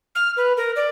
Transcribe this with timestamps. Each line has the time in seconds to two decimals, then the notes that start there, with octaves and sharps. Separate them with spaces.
0.15 F6
0.37 B4
0.57 A#4
0.76 D5